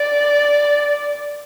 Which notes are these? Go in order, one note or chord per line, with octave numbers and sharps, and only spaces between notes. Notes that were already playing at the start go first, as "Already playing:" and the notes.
Already playing: D5